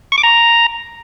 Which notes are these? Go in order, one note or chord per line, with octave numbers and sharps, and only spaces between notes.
C#6
D6
A#5